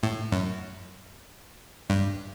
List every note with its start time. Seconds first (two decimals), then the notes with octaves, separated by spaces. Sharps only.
0.03 A2
0.32 F#2
1.90 G2